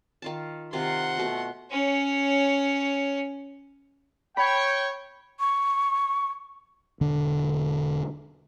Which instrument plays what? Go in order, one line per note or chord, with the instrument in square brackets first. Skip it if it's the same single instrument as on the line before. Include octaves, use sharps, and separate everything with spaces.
[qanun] D#3 F4 A5
[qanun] C3 D#3 F4 [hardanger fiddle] F#5 C6
[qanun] B2 A3
[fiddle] C#4 C#5
[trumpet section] C#5 G5 [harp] B5
[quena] C#6
[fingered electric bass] E1 D3 D4